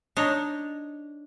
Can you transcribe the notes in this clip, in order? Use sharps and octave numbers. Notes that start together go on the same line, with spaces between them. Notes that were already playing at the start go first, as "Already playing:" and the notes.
D4 D#4 C#5 D#5